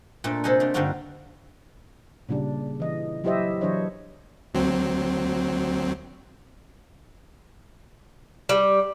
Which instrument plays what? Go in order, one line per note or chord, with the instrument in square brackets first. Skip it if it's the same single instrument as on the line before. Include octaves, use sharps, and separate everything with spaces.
[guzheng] A#2 A3 D4 A4
C3 A4 C5 D#5 F#5 G#5
A3 D4 F4
G2 D3 A#3 D#4 F4 F#4
[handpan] A#2 C#3 G3 D4
E3 D#5
F#3 E4 G4 C5 D#5 E5
E3 F#3 D4 C5 C#5 D#5
[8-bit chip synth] D2 F#3 C4
[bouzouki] G3